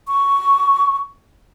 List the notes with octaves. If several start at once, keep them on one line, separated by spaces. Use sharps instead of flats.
C#6